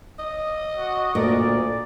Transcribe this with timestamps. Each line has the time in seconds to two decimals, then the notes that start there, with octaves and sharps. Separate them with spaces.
0.19 D#5
0.76 F#4
1.15 D2 A#2 D5